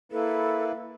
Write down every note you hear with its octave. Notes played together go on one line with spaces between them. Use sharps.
A#3 E4 A4 B4